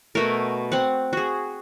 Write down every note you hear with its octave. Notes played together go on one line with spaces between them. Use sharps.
B2 A3 F#4 A#4
C4 F#5
F#4 G#4